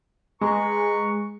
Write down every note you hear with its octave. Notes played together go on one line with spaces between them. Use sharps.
G#3 B4 A#5 C#6